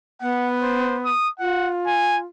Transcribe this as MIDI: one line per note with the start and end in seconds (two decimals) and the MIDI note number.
0.21 1.10 59
0.21 0.48 78
0.62 0.96 72
1.05 1.29 87
1.40 2.25 65
1.40 1.71 78
1.87 2.19 80